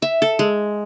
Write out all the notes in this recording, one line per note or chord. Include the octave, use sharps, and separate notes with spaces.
E5
A4
G#3